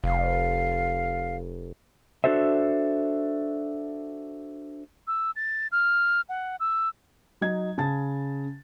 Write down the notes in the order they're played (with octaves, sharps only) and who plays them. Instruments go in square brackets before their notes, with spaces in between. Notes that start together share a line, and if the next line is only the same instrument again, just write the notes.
[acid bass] F1 [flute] F5
[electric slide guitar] D4 F#4 A4 C5 E5
[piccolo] E6
A6
F6
F#5
E6
[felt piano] F#3 D#4 G#6
C#3 A5 A6